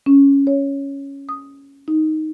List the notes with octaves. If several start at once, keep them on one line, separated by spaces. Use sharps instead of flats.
C#4
C#5
D#6
D#4